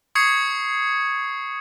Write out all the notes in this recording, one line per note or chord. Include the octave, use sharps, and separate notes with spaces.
C#6 D#6 G#6 C7 C#7